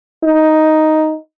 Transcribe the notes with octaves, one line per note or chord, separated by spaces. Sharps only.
D#4